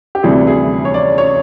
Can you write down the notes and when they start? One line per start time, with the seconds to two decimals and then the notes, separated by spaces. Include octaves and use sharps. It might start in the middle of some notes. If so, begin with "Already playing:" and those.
0.15 G4
0.23 D2 C3 E3 G3 G#4
0.47 G#4
0.85 C#5
0.94 D5
1.18 C#5